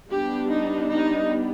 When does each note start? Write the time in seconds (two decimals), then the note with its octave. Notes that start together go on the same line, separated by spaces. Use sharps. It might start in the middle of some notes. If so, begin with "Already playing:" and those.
0.10 G3 B3 D4 G4
0.50 D#4
0.89 D#4